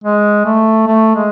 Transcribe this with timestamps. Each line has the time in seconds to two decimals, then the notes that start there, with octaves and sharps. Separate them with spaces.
0.04 G#3
0.45 A3
0.87 A3
1.15 G#3